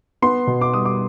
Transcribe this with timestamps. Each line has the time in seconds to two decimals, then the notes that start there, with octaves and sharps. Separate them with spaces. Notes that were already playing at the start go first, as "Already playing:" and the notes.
0.22 B3 C6
0.47 B2
0.61 D6
0.74 G3 D#6
0.85 D6